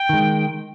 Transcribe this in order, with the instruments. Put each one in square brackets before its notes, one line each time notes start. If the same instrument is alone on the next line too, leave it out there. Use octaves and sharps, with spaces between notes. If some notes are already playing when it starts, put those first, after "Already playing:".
Already playing: [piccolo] G5
[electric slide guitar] D#3 G#3